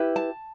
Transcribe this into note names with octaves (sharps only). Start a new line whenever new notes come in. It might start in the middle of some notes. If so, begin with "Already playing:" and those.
Already playing: E4 G4 B4
A5